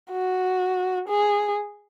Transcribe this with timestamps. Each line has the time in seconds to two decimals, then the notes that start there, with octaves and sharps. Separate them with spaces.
0.11 F#4
1.08 G#4